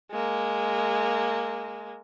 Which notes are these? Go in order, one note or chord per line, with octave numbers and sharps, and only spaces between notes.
G#3 A#3